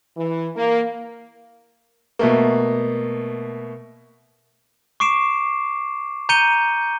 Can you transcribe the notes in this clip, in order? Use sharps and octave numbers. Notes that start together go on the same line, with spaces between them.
E3
A#3
B2 A3 A#3
C#6 D6 C7 D7 E7
A#5 G6 C#7 D#7 G7